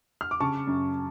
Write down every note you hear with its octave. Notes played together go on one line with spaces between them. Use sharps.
F6
D6
C#3 A5 C#6
F#2